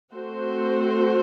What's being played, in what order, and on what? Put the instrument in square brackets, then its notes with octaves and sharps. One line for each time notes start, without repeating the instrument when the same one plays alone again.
[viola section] A3 C4 F#4 C5